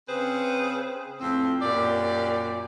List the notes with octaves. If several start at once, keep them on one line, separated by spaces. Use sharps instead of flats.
C#3 C4 G#4 B4 C5
F2 A2 C4
F#2 A#2 G4 D5